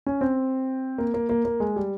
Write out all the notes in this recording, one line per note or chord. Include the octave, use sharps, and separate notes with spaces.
C#4
C4
A#3
A#3
A#3
A#3
G#3
G3